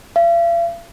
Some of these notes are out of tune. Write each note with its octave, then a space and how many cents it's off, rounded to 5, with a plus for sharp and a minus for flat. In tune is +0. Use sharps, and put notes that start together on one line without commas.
F5 -45